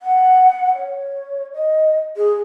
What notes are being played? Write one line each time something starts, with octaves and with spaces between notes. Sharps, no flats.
F#5
C#5
D#5
G#4